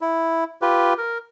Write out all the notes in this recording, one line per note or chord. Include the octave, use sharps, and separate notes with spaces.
E4
F4 G4 B4
A#4